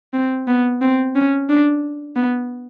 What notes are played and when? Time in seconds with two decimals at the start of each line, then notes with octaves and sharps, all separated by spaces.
0.13 C4
0.48 B3
0.82 C4
1.16 C#4
1.49 D4
2.16 B3